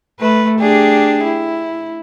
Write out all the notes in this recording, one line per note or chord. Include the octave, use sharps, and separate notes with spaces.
A3 B4
D4 G4 G#4
E4